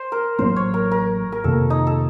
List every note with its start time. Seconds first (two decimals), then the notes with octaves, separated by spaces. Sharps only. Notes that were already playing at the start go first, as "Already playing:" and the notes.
Already playing: C5
0.12 A#4
0.39 A1 A2 F#3 A#3 C5
0.56 C#5
0.74 A#4
0.91 A#4
1.32 A#4
1.44 F2 C3 D#3 A#3 A4
1.70 D#4
1.87 A4